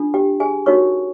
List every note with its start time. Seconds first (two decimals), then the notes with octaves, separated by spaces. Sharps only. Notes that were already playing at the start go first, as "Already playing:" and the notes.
Already playing: D4 F4 A4
0.14 G4 G5
0.40 G#4 G#5
0.66 D#4 F#4 A#4 C#5 C#6